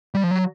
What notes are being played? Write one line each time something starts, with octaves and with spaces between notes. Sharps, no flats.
G3
F3
F#3